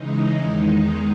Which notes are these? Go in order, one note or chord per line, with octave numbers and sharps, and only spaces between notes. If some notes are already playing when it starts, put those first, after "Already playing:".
Already playing: C#3 E3 G#3 D#4
E2 D#3 G#3